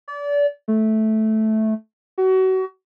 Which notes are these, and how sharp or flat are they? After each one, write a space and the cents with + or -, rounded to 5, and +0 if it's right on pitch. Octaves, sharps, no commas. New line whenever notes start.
D5 -30
A3 -10
F#4 +30